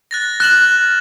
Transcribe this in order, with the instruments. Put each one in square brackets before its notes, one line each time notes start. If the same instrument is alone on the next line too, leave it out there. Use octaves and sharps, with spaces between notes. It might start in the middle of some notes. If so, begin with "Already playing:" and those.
[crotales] F#6 A6 A#6
[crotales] F6 E7 F#7 [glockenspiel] F#6